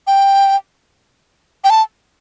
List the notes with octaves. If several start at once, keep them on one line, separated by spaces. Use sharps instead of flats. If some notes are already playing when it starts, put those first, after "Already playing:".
G5
G5
A5